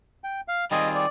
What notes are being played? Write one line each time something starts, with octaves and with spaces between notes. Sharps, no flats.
G5
F5
D#3 G3 C4 F4 G#4 D#5
D5